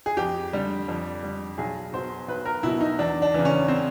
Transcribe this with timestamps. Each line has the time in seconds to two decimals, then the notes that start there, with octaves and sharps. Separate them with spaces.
0.06 G#4
0.17 F2 G4
0.53 D3 G3
0.88 F2
1.23 D3 G3
1.58 B1 G#4
1.93 B2 F#3 C5
2.28 B1 B4
2.45 A#4
2.63 B2 F#3 E4
2.81 D#4
2.99 E2 D4
3.22 D4
3.34 C#3 E3
3.45 C#4
3.68 C4